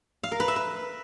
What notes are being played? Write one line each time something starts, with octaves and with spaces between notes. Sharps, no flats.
F5
A#4
B4
E5
B4